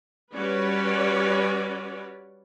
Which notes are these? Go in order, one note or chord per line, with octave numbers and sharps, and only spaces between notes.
G3 C#4 F#4 B4 C#5 D5